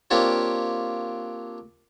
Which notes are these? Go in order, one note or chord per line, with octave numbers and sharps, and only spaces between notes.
A#3 C4 D4 F4 G4 C#5